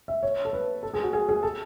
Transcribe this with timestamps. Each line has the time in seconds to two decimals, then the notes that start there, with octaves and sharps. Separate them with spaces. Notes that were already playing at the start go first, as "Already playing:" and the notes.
0.08 E5
0.23 C#5
0.45 A4
0.53 B4
0.83 A4
0.94 G#4
1.03 F#4
1.13 G#4
1.29 G#4
1.43 A4